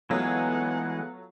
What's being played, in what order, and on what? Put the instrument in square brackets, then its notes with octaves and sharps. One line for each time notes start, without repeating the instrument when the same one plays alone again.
[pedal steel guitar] E3 G#3 G#4 [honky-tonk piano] F#3 A3 F4 [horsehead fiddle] B3 F#5